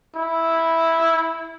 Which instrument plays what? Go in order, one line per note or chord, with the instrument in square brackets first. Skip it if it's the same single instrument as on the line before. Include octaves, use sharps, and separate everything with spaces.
[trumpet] E4